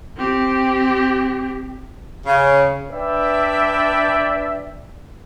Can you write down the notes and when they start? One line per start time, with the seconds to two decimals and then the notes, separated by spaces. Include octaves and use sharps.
0.17 C4 G4
2.26 C#3
2.90 D4 B4 D5 E5 G5